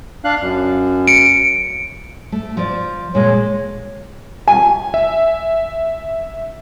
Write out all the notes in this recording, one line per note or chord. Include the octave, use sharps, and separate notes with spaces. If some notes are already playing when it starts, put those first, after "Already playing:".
D4 F5 F#6
F#2
C#7 D7
A3
F3 D5
A#2 G#3 C#5
G#5
E5